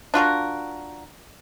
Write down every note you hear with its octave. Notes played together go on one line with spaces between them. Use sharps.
D4 F4 F#4 A#4